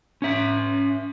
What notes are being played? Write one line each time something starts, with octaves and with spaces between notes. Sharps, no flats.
C#4 E5